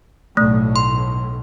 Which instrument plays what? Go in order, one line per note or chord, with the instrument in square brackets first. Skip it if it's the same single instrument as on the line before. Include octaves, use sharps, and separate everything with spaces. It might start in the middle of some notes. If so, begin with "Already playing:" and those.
[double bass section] B1 A2 [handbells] A3
[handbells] C6